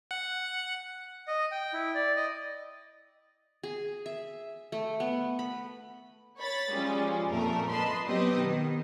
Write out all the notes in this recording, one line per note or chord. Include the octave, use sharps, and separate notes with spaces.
F#5
D#5
G5
E4
D5
D#5
G#4
E5
A3
B3
B5
C#5 B5 A6
F3 G3 G#3 C#4 F4
F2 A#2 A3 A#4
B4 D#5 A5 B5 C6
F#3 B3 C4 G4 B4 D#5
B2 D#3